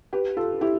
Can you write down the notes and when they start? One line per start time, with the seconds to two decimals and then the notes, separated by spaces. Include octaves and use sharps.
0.13 G4 B4
0.37 F4 A4
0.61 E4 G4